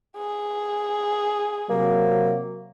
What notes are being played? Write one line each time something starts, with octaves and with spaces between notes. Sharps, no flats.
G#4
C3 F#3 A#3